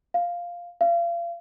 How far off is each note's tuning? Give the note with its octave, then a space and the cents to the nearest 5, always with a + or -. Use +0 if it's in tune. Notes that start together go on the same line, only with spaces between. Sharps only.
F5 +0
F5 -35